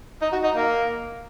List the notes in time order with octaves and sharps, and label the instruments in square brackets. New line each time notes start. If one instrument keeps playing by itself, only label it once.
[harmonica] D#4
F#4
D#4
A#3